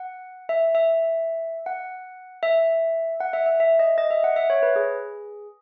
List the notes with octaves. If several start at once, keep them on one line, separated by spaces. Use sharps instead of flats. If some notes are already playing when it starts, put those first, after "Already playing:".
Already playing: F#5
E5
E5
F#5
E5
F#5
E5
E5
E5
D#5
D#5
E5
F#5
E5
C#5
B4
G#4